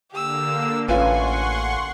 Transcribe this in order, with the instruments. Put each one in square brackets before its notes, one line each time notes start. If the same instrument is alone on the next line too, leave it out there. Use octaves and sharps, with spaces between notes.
[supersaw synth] D3 A#3 [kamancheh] G4 E6
[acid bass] A1 [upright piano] C#4 F4 B4 [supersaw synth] F#5 C6 C#6 [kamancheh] G#5